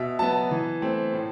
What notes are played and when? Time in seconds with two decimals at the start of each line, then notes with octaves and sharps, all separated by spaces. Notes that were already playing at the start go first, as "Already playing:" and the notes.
Already playing: B2 E5
0.19 F#3 B3 A5
0.51 E3
0.82 A3 C4
1.13 A2